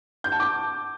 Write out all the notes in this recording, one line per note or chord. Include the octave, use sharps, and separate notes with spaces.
G6
A5
D6